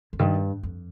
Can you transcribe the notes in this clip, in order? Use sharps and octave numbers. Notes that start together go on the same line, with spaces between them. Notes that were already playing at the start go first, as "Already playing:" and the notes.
F2
G2 D#3
F2